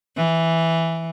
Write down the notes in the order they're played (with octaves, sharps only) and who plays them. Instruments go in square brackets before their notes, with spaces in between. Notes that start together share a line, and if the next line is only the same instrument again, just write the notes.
[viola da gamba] E3